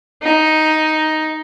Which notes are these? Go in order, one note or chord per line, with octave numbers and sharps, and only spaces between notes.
D#4